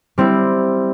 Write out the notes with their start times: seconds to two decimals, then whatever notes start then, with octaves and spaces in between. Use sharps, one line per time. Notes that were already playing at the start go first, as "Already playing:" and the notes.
0.18 G3 C4 E4